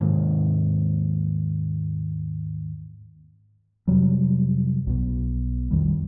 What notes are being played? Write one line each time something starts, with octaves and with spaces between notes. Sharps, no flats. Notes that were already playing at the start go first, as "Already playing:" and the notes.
D#2 G#2
F2 C3 F#3 G3
B1 B2
B1 F2 D#3 G3